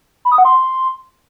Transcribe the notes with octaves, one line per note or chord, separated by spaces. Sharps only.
B5
D#6
F#5
C6